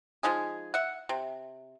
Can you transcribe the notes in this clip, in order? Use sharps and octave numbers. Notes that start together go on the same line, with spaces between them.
F3 G#3 D#4 G#4
E5 F#5
C3